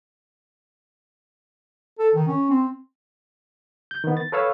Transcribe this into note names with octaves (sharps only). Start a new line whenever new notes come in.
A4
D#3
C#4
C4
G6
D#3 B3
A6
A4 B4 C#5 F5 E6